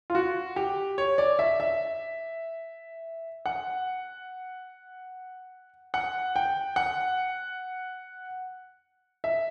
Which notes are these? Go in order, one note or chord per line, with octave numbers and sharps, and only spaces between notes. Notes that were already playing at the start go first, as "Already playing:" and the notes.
F4
F#4
G4
C#5
D5
E5
E5
F#5
F#5
G5
F#5
E5